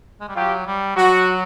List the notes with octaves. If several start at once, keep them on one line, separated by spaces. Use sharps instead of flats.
G#3
G3
F#3 F4 G4
G3
F#3 F#4